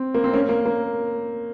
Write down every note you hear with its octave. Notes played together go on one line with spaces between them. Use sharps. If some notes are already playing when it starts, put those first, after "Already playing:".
Already playing: C4
A#3
C4
A#3 C#4
A#3
A#3